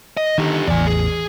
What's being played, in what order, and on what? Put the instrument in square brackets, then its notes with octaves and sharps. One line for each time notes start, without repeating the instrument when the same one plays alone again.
[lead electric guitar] D#5
[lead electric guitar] D3 G4 [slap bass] D#3
[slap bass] A1 E2 [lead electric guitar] D5 G#5
[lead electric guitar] G#4